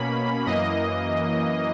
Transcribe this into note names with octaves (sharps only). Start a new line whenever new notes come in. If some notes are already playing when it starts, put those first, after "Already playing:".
Already playing: B2 A#3 C#4 B5
F#2 E3 A#3 D#5